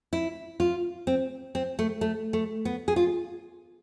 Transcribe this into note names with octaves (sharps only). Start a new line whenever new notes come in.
E4
F4
C4
C4
A3
A3
A3
B3
G#4
F4